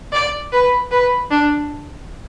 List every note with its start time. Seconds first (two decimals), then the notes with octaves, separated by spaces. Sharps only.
0.12 D5
0.52 B4
0.91 B4
1.31 D4